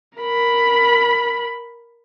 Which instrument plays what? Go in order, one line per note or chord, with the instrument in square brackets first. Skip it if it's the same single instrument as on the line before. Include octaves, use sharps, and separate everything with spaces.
[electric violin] A#4 B5